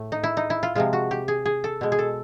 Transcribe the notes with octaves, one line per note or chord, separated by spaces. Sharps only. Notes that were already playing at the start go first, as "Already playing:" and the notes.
Already playing: A2 A3
D#4
E4
D#4
E4
F4
C3 F3 G#3 F4
F#4
G4
G#4
G#4
A4
B2 G#3
G#4
A4